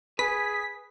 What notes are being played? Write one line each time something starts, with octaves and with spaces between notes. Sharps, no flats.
G#4 B4 B6